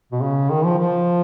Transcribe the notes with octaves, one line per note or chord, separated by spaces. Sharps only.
B2
C#3
D#3
F3
F3